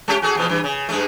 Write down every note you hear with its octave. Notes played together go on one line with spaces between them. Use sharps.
G#3 C#4 G4
F#4 G#4 A4
E2 B2 F3
G2 E3
C#3
G2 G#3 A3